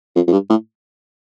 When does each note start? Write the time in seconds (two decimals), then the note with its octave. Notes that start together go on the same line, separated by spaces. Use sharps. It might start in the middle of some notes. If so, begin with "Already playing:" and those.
0.16 F2
0.27 F2
0.32 G2
0.50 A2